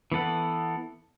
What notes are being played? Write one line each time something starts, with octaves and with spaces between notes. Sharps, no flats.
E3 B3 A4 F#5